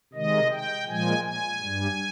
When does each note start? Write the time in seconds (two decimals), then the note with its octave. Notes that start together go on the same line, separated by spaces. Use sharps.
0.13 C3 D#3 G#3 D#5
0.51 G5
0.88 A#2 F3 G#3 G#5
1.24 G#5
1.62 G2 G3